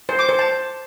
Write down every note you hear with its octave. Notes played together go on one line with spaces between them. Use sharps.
C5
D6
C5
A5